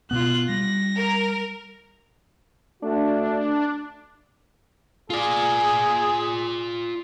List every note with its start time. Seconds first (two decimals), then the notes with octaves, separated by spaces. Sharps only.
0.11 B2 B3 F4 F#6
0.49 G3 A#6
0.96 A#4
2.82 A3 D4 F#4
5.10 F4 G#4 D5